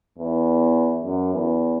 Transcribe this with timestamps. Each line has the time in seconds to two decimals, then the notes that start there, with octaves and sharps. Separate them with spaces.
0.18 E2
1.04 F#2
1.33 E2